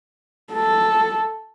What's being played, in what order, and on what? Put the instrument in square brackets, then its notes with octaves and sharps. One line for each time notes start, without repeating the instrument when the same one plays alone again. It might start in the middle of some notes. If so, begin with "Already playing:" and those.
[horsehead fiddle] A4